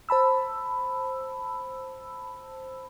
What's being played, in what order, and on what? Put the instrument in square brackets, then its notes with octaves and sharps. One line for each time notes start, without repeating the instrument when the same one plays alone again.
[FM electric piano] C5 A5 B5 E6